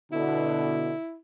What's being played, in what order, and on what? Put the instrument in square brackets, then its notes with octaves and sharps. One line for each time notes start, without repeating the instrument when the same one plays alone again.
[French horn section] B2 D3 [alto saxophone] E4